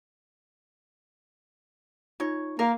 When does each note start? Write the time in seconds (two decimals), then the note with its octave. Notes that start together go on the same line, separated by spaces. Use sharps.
2.20 D#4 F4 C#5
2.59 A#3 A#4 F5 A#5